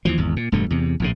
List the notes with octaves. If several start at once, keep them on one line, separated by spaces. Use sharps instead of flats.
D#2 E3 F3
G#1 E2
A#2
E1 G2 B2 A3
E2 C3
A#1 A2 C3